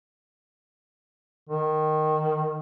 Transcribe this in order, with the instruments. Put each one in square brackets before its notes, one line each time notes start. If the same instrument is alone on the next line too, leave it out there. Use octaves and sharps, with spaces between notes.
[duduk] D#3